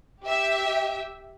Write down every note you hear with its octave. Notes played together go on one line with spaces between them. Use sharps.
G4 E5